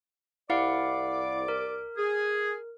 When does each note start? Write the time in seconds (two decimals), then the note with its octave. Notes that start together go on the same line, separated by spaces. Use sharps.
0.50 C2 E4 D5 F5 F#5 D6
1.48 A#4
1.97 G#4